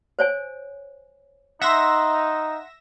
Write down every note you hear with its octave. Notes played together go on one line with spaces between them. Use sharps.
C5 C#5 G#5
D#4 E5 F#5 C6 A#6 E7